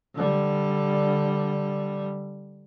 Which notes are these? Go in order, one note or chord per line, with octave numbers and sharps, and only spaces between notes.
D3 G3